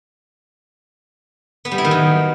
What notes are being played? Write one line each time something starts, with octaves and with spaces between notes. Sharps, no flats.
B3
G3
E4
D#3
F#3